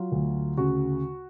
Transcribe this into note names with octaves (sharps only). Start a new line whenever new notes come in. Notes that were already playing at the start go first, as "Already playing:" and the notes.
Already playing: F#3 F4
D2
C#3 F#4